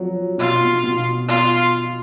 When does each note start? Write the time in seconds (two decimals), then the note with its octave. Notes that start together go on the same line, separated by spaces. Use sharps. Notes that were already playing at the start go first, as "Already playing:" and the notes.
Already playing: F3 F#3
0.38 B2 F4
0.61 B2
0.83 B2
1.28 F4